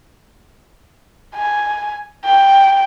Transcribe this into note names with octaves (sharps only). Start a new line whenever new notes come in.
G#5
G5